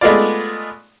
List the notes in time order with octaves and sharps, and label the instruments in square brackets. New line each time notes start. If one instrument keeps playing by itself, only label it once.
[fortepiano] G#3 A3 B3 F4 D5